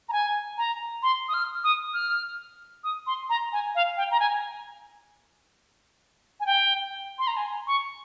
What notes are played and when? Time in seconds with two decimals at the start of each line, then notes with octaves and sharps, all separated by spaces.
0.09 A#5
0.13 G#5
0.58 A#5
1.03 C6
1.28 D#6
1.34 F6
1.64 D#6
1.94 F6
2.84 D#6
3.07 C6
3.30 A#5
3.53 G#5
3.75 F5
3.97 G5
4.11 A#5
4.20 G#5
6.40 G#5
6.46 G5
7.19 C6
7.27 A#5
7.37 G#5
7.67 C#6